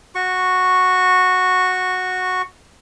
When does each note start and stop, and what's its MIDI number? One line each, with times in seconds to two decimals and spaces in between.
0.15 2.42 66
0.15 2.42 85